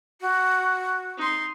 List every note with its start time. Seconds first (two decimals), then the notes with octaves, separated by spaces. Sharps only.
0.21 F#4
1.18 D#4 C6